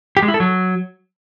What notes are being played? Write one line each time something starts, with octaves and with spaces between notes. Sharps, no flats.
G4
G#3
E4
A4
F#3